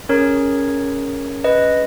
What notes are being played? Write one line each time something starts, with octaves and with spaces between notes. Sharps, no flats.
C#4 G#4 A#4 C#5
B4 D#5